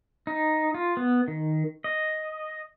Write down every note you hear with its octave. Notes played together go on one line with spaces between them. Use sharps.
D#4
F4
B3
D#3
D#5